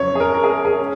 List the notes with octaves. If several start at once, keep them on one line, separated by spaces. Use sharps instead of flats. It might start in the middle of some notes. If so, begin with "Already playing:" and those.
Already playing: F2 C#3 F#3 C#5
G#4
A#4
A#4
G#4
A#4
G#4
C#4